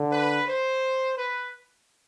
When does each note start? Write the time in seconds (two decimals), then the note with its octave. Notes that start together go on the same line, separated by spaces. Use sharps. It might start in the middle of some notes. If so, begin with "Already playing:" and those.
Already playing: D3
0.12 B4
0.47 C5
1.17 B4